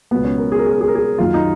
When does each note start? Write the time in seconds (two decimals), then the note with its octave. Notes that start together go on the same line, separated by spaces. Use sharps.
0.11 C#2 B2 F#3 B3
0.24 C#4
0.38 A#4
0.52 G#4
0.59 A#4
0.66 G#4
0.73 A#4
0.81 G#4
0.88 A#4
0.95 G#4
1.18 F#2 D#3 F#3 F4
1.34 D#4